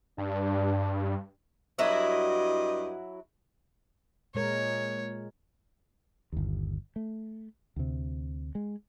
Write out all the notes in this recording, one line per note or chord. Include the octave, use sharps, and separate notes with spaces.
G2 D4
G2 F#3 E4 F#4 D#5
A#2 G#3 A#4 C#5
G1 D#2
A3
D2 C3
G#3